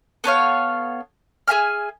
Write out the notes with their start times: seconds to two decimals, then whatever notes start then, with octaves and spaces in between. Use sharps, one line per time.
0.24 B3 A4 C#5 F5
1.47 G#4 E5 G#5 F6